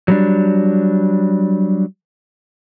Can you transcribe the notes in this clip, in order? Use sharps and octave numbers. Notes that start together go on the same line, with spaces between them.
F#3 G3 D4